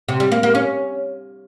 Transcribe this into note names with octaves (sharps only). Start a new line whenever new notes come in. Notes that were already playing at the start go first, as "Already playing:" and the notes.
C3
G3
A#3
A#3
C#4